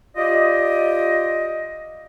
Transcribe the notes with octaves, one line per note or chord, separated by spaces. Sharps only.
F4 G4 D5 D#5